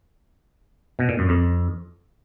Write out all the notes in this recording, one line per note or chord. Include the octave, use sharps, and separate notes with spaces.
B2
A#2
F#2
F2